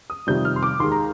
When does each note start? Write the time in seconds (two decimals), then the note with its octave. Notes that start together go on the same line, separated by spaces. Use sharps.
0.10 D#6
0.27 F2 C3 D#3 G3 G6
0.45 F6
0.56 C6
0.63 D6
0.80 D#2 D#3 G#3 C6
0.92 A#5